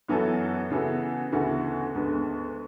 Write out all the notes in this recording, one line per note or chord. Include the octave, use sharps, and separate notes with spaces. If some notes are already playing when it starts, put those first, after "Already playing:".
F#2 E3 B3 F#4 A4
C#3 E3 B3 F#4 A4
D2 C#3 E3 B3 F#4
D2 D3 G#3 B3